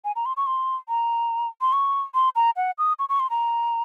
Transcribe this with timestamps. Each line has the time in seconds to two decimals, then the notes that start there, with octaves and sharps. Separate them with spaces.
0.04 G#5
0.16 A#5
0.25 C6
0.37 C#6
0.46 C6
0.89 A#5
1.61 C6
1.73 C#6
2.14 C6
2.36 A#5
2.56 F#5
2.78 D#6
2.99 C#6
3.09 C#6
3.20 C6
3.30 A#5